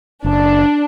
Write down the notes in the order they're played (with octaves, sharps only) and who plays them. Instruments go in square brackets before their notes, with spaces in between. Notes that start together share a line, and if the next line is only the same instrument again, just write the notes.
[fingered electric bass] F#1 [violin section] D4